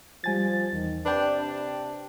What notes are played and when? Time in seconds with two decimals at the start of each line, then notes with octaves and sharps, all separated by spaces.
0.24 F3 G3 G#5 A6
0.72 E2 D#3
1.06 C3 D4 B4 G5
1.40 D4